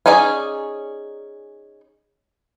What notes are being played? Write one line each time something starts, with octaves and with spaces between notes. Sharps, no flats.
C#4 D#4 G#4 D5 G#5